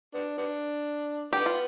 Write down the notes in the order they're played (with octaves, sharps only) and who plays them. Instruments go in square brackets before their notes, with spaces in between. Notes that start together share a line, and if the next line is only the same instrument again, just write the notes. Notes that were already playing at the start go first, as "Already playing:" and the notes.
[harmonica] B3 D4
B3 D4
[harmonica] D3 B3 [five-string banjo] G4
[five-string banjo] F4